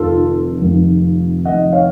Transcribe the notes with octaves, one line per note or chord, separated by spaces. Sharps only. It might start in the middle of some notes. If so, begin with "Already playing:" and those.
Already playing: F1 F2 D#3 F4 A4
F1 F2 D#3
F1 F2 D#3 D#5 F#5
C#5 F5